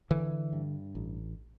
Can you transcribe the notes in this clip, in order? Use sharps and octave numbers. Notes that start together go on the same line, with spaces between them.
D3 E3
G2
A1